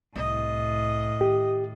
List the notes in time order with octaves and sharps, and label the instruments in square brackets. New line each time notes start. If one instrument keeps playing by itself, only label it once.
[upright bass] C2 [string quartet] A2 [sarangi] D#5
[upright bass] D#3 [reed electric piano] G4